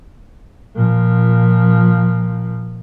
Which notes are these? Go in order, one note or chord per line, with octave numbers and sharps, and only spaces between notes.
A#2 F3